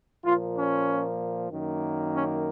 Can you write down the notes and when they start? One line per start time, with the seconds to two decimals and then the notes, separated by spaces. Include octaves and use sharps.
0.25 A#2 F3 A#3 F4
0.56 C#4
1.50 F#2 D#3 A#3
2.13 C#4